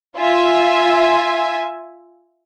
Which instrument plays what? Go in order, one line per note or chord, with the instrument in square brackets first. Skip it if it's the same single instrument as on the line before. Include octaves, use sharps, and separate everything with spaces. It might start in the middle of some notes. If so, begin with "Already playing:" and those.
[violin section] F4 E5 G#5